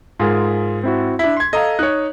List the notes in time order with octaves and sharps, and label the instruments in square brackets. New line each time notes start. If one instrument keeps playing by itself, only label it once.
[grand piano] G#2 [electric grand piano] F4 G#4 A#4
[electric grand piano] C4 E4 F#4
[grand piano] D4 E4 [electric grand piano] B6
[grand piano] C6 G#6
[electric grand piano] A4 A#5 [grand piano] D#5 F5
[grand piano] D#4 C#5 [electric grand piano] F#6